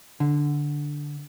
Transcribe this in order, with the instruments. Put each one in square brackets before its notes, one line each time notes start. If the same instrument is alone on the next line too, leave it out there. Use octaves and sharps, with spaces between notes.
[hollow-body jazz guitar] D3